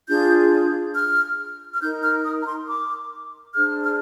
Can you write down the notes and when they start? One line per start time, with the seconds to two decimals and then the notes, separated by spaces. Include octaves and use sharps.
0.08 D4 F4 G#4 G6
0.94 F6
1.72 F6
1.81 D#4 A#4 G6
2.03 F6
2.25 D#6
2.41 A#5
2.46 C6
2.68 D6
3.54 D4 G#4 C5 F6
3.83 F6